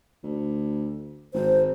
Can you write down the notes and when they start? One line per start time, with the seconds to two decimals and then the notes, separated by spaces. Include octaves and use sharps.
0.23 D2
1.34 G#1 C5